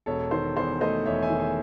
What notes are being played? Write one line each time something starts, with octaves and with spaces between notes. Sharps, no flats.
E1 A4 C#5
D#3 C5
E2 C5
A3 C5 D#5
E2 C#5 E5
E5 G#5
D#3
E5 G#5